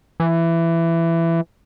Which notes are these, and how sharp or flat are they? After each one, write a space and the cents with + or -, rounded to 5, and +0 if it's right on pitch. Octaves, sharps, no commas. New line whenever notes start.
E3 +15